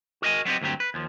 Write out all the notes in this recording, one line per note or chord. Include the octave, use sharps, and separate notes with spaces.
F#4 A#4 D#5 E5 G#5
F#3 B3 C4 G4 D#5
D2 G2 F#3 C4 G4
B4
D#2 F3